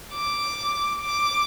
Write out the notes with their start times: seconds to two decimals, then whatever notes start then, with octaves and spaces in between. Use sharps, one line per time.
0.14 D6
1.01 D6